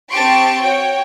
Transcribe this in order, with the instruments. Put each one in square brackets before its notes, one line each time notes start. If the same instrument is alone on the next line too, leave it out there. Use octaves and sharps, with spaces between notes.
[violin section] C4 G4 A5 C6 C#6 D7
F#4 C#5 G5